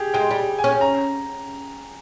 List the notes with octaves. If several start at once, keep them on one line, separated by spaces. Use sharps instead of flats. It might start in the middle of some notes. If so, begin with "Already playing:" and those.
Already playing: G4 G#4
G#3 G5
G3
G#5
C#4
A#5